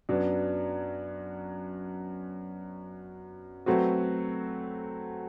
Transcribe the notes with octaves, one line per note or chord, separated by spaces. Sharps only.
F#2 F#3 B3 D4
F#3 A3 C4 F#4 B4